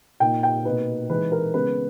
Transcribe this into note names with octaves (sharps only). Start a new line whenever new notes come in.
A#2 A#3 D#4 G5
G5
B2 A#3 D#4 B4
E3 G#3 D#4 B4
A#4
C#3 G#3 B3 B4